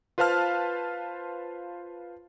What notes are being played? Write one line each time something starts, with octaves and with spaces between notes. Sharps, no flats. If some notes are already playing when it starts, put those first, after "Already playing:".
F4 B4 C5 F5 A5 F6